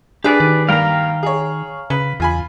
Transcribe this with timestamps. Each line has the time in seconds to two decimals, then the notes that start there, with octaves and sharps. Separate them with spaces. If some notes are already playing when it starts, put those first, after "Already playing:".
0.24 D4 G4 G#4 B4 D5
0.40 D#3
0.69 G2 A#3 F5 G5 A#5
1.23 G#4 C#5
1.90 C#3 B4
2.20 E2 F4 G#5 B5